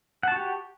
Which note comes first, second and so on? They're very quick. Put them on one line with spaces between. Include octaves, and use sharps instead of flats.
F#5 A5 F#4 G4